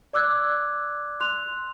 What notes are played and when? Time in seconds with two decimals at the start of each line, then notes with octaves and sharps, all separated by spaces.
0.13 D5 D6 E6 F#6 G#6
1.20 C6 F#6 F7